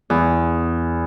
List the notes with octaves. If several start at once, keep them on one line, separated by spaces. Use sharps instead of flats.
E2